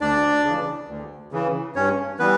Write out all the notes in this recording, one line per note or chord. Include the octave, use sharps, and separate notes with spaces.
D2 D4 D5
C#3 E3
D2
C#3 E3
G2 C#4 C#5
E3 G3 B3 B4